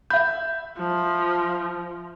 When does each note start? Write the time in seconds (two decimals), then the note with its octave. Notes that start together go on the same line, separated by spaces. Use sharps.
0.10 E5 B5 G6
0.77 F3